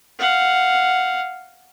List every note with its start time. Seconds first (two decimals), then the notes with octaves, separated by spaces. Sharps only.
0.19 F5 F#5